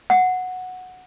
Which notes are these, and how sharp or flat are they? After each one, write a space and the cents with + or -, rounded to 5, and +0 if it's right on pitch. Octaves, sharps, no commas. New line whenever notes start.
F#5 -5